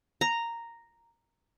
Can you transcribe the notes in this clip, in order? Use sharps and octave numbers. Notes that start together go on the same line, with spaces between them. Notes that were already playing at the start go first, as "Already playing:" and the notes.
A#5